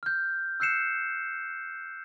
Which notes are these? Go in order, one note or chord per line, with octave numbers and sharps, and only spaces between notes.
F6 G6
E6 F#6 G6 C7 C#7 E7